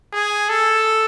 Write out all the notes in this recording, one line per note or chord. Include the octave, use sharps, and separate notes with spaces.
G#4
A4